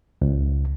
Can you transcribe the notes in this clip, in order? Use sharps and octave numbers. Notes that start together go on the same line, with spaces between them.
C#2